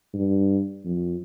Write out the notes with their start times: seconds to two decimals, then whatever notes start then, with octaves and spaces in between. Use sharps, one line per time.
0.14 G2
0.85 F2